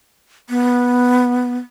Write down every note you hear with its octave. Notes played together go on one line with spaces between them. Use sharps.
B3